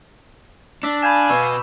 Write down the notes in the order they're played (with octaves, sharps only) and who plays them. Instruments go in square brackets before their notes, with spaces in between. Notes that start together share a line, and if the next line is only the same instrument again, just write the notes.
[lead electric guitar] D4 [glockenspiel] D6 E6 B6
[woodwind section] F5 G#5 [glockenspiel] B5 G6 E7
[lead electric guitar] B2 B3 [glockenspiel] C#6 E6